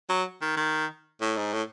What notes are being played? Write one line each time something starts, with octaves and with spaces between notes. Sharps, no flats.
F#3
D#3
D#3
A2
G#2
A2